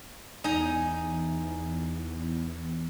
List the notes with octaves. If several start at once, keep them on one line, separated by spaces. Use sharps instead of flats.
E2 D#4 G#5 A#5